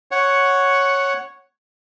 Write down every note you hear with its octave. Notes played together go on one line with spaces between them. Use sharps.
C#5 F#5